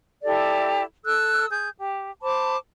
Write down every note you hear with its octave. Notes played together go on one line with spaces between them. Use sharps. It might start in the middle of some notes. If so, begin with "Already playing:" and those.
E4 G4 A4 D5
A4 E6 F#6
G#4 G6
G4
C5 A5 B5 D6